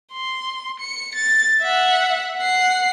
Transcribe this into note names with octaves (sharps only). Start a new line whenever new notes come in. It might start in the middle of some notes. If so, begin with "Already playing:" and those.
C6
C#7
A6
E5 F#5
F#5 C7